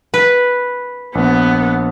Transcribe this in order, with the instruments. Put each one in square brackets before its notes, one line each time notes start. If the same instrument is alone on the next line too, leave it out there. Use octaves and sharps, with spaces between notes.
[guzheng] B4
[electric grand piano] A#1 [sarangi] B3